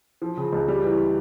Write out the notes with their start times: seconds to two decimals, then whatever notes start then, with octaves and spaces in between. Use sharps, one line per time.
0.22 F3
0.37 C#3
0.53 C#2
0.68 G3
0.84 E3